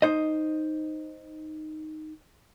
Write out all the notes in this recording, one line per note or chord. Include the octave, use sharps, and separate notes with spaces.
D#4 C5 D#5